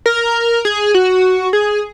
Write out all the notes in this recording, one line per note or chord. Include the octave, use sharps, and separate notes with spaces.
A#4
G#4
F#4
G#4